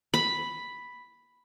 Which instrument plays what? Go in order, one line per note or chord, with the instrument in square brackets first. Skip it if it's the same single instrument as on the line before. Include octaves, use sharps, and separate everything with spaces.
[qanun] B5